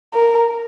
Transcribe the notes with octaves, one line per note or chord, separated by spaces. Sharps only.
A#4